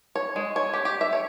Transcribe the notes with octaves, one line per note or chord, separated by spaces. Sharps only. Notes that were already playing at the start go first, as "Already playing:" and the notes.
C#5
G#3
C#5
G4
G4
E5
C#5